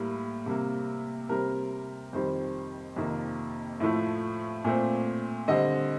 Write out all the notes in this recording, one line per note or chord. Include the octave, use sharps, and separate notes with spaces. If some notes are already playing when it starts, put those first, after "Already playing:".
Already playing: A2 G3 A#3
C3 G3 A#3
C3 G3 C4 A#4
F2 D#3 G3 C4 C5
F2 C3 D#3 A#3
A2 F3 A3
A#2 A3 C4
D3 G3 C4 D#5